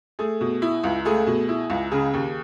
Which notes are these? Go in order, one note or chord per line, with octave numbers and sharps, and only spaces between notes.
A3 G#4
B2
E4
C#2
A3 G#4
B2
E4
C#2
C#3 G#4
D#2